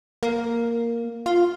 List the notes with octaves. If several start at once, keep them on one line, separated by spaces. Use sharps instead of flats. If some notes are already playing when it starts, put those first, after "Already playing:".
A#3
F4